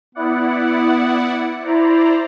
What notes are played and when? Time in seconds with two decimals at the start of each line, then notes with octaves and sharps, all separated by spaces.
0.15 B3 E4 D5 F#5
1.62 E4 C5 D5 A#5